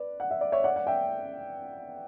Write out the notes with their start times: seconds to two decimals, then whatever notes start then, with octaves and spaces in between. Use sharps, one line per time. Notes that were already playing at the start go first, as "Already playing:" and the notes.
Already playing: B4 D5
0.20 F#5
0.31 E5
0.41 D5
0.52 C#5 E5
0.64 D5 F#5
0.76 F#5
0.87 E5 G5